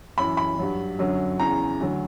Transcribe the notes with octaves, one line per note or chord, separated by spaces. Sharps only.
F#2 E3 B5
B5
G2 F#3
F#2 D3 F#3
E2 C#3 E3 A#5
D2 D3 F#3